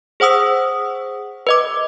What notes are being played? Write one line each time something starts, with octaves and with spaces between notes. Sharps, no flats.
G#4 C5 F#5 D#6 E6
B4 D#5 D6